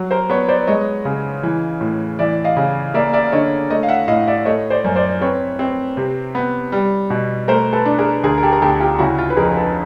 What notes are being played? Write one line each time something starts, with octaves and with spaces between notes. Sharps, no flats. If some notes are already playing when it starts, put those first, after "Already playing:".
Already playing: F#3
A#4 C5
B3 B4 C#5
C5 D5
G#3 C#5 D#5
C#3
E3
A2
E3 D5 E5
D#5 F5
C#3
A#3 D5 E5
D5 E5
D3 C#5 D#5
A3 C#5 D#5
F5
E5 F#5
A2 D#5 F5
D5 E5
A3 C#5 D#5
C5 D5
F#2
C5 D5
C4 B4 C#5
C4
C3
B3
G3
B2
A3 A#4 C5
A4 B4
D4
G#4 A#4
D2 G#4 A#4
A#4
G4 A4
A#4
D2 G4 A4
F4 G4
C#3 E4 F#4
F4
B4
F2 G#4 A#4
A4 B4